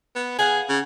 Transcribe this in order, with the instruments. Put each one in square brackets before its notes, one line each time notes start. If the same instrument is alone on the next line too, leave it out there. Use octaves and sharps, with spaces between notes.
[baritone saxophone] B3
[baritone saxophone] G#4 [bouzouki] F5 F#5 G#5
[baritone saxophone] C#3